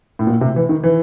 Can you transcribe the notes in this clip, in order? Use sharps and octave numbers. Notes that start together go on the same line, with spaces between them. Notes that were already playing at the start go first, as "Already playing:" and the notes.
A2
A#2
C3
E3
D#3
E3